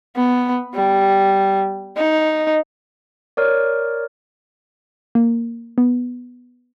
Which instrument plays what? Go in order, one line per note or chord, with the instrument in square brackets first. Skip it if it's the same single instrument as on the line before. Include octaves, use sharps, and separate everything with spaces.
[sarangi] B3
G3
D#4
[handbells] A#4 C#5 D5
[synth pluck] A#3
B3